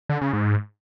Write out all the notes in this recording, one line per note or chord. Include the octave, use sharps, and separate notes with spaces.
D3
C#3
G#2